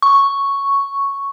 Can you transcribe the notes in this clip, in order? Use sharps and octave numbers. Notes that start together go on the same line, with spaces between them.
C#6